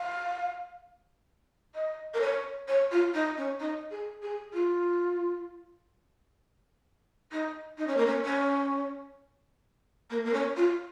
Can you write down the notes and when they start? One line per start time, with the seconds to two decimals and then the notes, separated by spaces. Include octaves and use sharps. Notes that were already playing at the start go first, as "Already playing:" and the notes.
Already playing: F5
1.75 D#5
2.14 A#4
2.21 C#5
2.68 C#5
2.92 F4
3.14 D#4
3.37 C#4
3.60 D#4
3.91 G#4
4.22 G#4
4.53 F4
7.32 D#4
7.78 D#4
7.87 C#4
7.97 A#3
8.06 C#4
8.25 C#4
10.10 A#3
10.25 A#3
10.33 C#4
10.57 F4